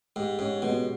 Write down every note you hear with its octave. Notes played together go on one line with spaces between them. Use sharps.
G#2 G4
G#2 C#4
B2 G#3